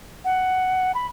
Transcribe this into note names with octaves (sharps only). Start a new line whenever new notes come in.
F#5
B5